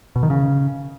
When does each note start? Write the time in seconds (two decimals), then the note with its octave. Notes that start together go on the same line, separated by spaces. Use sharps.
0.16 B2
0.23 D#3
0.30 C#3